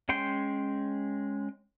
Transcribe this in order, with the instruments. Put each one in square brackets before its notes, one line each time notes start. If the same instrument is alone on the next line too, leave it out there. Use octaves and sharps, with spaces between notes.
[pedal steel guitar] G#3 C#4 G5 C6 G6